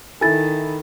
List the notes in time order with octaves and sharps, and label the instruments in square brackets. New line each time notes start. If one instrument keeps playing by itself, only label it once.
[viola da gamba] D#3 [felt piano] E4 A4 [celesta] G#5 A6